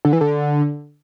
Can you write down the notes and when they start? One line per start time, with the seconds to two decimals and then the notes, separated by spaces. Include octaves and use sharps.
0.05 D3
0.13 E3
0.21 D3